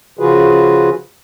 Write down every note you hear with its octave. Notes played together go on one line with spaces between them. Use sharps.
C#3 F3 F4 F#4 G#4 B4